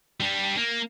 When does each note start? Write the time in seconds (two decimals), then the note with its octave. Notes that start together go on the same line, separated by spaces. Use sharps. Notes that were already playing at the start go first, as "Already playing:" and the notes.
0.20 G3 D4
0.57 A#3